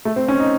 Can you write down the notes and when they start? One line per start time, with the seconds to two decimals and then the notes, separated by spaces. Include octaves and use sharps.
0.05 A3
0.16 C4
0.28 C#4
0.39 D#4